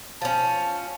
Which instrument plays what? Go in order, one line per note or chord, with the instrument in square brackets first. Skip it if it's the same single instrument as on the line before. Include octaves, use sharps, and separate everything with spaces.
[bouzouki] F3 C#4 [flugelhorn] A5